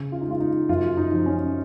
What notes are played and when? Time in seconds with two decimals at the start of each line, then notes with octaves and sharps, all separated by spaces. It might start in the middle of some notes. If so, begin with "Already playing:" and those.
Already playing: C#3
0.12 F4
0.21 D#4
0.26 G#3 F4
0.40 D#4
0.69 F#2 F4
0.97 D#4
1.12 F3
1.26 C#4